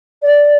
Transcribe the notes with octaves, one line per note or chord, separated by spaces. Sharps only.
D5